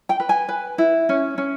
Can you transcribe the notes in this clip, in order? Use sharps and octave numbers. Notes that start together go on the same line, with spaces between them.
G5
B4
G#5
B4
E4
C#4
C#4